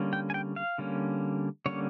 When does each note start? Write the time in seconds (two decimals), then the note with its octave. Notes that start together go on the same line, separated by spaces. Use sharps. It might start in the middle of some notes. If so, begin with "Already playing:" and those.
Already playing: D3 G3 A#3 C#4
0.13 G5
0.30 G#5
0.34 G5
0.56 F5
0.78 D3 G3 A#3 C#4
1.66 D3 G3 A#3 C#4 C#5